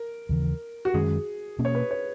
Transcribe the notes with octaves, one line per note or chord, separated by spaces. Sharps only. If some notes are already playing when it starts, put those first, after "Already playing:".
Already playing: A#4
D#2 C#3 E3
F#4
F#2 D#3 G#3 C#4 G#4
B2 A#3 C#4
C#5
B4
C#5